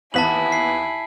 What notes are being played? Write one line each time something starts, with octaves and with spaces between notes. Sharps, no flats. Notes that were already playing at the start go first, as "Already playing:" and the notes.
D#2 E3 B3 E4 G#5 A5 B6 F#7
C7